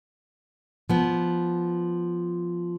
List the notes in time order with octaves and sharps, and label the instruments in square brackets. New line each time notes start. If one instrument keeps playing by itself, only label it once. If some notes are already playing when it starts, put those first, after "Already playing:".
[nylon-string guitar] F3 B3